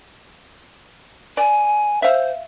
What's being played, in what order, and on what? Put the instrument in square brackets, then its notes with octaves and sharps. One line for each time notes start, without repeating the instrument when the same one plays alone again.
[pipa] D5 [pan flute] G#5
[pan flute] C5 [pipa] E5 F5